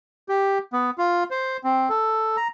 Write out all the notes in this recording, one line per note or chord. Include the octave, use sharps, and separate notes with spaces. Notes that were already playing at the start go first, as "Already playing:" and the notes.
G4
B3
F4
C5
C4
A4
A#5